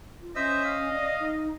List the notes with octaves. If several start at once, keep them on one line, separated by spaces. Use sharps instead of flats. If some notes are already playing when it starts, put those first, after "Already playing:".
F4
C#4 C5 D#5 E5 E6
F5
D5
D#4